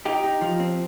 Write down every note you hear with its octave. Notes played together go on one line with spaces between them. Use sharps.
D#4 G4
D#4
F3
C4